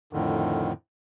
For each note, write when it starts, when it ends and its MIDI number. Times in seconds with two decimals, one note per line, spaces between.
0.13 0.72 41
0.13 0.72 45
0.13 0.72 50
0.13 0.72 51